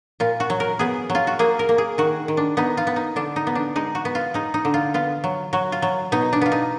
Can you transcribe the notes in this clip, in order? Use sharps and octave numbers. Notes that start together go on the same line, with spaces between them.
A#2 F4
F#4
F#3
A#4
B3 G#4
F#3
F4
F#4
A#3 G#4
A#4
A#3
G#4
D#3 F#4
D#3
D4
B3 D#4
F4
B3
D#4
D3 D4
D#4
B3
D4
G#3 D#4
F#4
B3
F4
G#3 D#4
D#4
D3
F4
B3 F4
F#3
F#3 F#4
F4
F#3
B2 D#4
D4
B3 F4
D#4